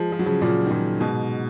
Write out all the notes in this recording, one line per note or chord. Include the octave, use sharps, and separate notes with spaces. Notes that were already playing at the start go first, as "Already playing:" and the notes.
Already playing: F3 G#3
F3
F#3
C#3 F3
A#2 C#3
D#3
A#2 C#3
G#2 B2